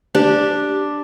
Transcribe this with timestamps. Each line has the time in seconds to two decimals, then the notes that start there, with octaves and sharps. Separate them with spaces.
0.15 D4 G4